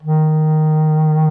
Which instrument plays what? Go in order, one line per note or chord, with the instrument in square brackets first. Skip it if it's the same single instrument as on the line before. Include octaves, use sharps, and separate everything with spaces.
[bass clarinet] D#3